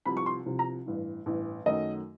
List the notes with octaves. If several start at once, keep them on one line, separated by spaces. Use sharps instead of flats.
C2 C3 F3 B5
C#6
C6
C2 C3 F3
A#5
A1 G2 E3
A1 G2 E3
F#2 D#3 F#3 A3 D#5